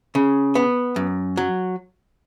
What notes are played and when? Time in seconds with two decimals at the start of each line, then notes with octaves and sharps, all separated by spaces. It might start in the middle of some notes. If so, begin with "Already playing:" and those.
0.15 C#3
0.55 B3
0.96 F#2
1.37 F#3